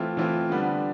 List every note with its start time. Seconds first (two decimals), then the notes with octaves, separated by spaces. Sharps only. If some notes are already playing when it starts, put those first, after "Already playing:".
Already playing: E3 A3 C4 F4
0.17 E3 A3 C4 F4
0.49 D3 G3 B3 D4